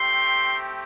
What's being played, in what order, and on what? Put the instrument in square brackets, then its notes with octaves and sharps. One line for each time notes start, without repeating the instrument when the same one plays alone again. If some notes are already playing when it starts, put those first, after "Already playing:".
Already playing: [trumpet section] A3 C4 G4 C6